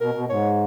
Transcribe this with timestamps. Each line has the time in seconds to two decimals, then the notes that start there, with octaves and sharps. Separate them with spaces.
0.01 B2 A#4
0.15 B2
0.30 G#2 C#5